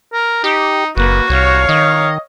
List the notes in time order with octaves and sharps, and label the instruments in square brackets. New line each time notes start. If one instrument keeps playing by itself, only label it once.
[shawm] A#4
[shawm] D#4 [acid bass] G4
[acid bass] F#1 [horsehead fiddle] A#3 B4 [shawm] F#4
[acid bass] C2 [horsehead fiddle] C#5 F5
[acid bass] D#3 [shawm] D#5